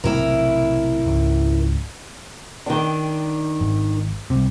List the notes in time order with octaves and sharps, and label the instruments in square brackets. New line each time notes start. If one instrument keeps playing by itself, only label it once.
[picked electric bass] B1 A2 C3 [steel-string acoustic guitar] E4 A#4
[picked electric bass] C#2 G#2
[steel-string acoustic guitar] D#3 D4
[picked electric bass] G#1
C2 C3